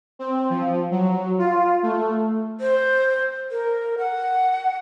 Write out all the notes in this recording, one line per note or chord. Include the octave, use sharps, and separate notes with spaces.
C4
F3
F#3
F4
A3
C5
A#4
F#5